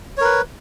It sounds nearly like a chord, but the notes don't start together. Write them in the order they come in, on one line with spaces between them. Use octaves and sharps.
C#5 A#4 B4